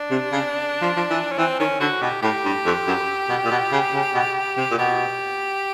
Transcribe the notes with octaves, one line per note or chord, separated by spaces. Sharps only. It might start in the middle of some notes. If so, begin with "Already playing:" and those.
Already playing: D4
C3
C#3
F3
F3
E3
C#4
E3 C4
D#3 C#4
D3 F#4
B2 G4
A2 G4
G2
F2
F#2
B2
A#2
B2
C#3
C#3
B2
C3
A#2
B2 G4